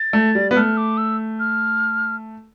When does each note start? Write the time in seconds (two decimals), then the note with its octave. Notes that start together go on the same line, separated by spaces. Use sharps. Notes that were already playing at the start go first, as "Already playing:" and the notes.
Already playing: A6
0.13 A3
0.35 G3
0.51 B3
0.56 A3 F6
0.77 D6
0.97 E6
1.40 F6